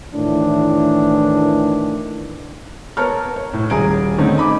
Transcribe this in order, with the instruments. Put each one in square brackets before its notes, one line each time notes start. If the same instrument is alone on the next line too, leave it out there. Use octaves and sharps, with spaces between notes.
[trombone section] A2 D#3 E3 D4
[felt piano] B3 A#4 C#5 A5 F6
C#5
A2
D#1 G#4 G#5 A#5 D7
D3 D#3 A3 C4 C#4 D#4
D#5 B5 D6